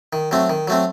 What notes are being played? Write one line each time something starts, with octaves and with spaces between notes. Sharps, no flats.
D#3
F#3 A3 C4
D#3
F#3 A3 C4